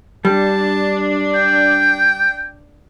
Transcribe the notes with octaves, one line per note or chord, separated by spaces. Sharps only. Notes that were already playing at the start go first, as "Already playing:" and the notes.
G3 D4 A5
G5